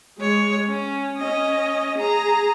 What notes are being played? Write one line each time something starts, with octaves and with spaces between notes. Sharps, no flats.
G#3 C#5
C#4
C#4 D#5
G#4 A#5